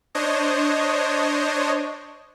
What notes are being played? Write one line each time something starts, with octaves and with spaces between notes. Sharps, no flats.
D4 C5 C#5 D#5